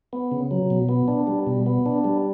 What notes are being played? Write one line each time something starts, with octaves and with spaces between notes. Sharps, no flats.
B3
C#3
F#3
B2
B3
D4
G3
B2
B3
D4
G3